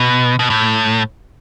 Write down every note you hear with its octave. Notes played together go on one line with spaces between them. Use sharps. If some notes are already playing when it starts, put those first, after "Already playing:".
Already playing: B2
B2
A2